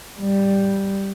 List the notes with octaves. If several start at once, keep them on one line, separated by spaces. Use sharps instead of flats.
G3